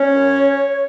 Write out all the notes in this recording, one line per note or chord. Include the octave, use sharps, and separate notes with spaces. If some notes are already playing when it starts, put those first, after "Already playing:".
Already playing: C#4 C#5
F#2